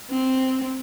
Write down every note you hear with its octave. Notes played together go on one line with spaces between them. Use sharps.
C4